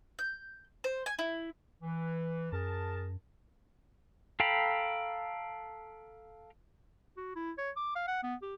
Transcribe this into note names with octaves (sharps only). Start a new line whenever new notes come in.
G6
C5
G#5
E4
E3
F#2 G#4 A#4 A5
A4 F5 G5 A#5 B5
F#4
E4
C#5
D6
F5
F#5
B3
G4